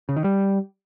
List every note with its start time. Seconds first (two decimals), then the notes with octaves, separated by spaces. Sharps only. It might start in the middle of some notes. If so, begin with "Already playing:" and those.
0.09 C#3
0.17 D#3
0.24 G3